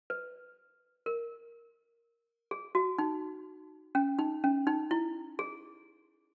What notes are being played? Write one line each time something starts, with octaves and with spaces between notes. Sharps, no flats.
B4
A#4
G#4
F#4
D#4
C#4
D#4
C#4
D#4
E4
G#4